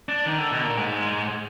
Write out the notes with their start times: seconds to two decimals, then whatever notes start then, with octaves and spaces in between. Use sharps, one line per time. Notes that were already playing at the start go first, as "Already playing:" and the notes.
0.09 D4
0.26 D#3
0.38 D3
0.51 B2
0.63 A#2
0.77 G#2